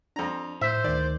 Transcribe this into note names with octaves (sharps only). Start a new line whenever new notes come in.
F2 D4 A#5
A2 C5 E5
D2 D#3 D5